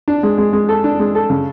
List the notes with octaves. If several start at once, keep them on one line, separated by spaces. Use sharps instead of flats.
D4
G#3
G#3
G#3
A4
D4
G#3
A4
C#3